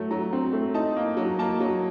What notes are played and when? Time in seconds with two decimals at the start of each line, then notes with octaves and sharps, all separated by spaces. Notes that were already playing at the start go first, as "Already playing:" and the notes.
Already playing: F#3 A3
0.11 F#3 A#5
0.33 C4
0.53 A3
0.74 D#4 A5
0.96 A#3
1.17 F#3
1.39 A#3 A5
1.60 F#3